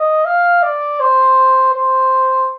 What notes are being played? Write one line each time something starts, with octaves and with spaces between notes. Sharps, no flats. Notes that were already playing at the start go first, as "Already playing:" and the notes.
Already playing: D#5
F5
D5
C5
C5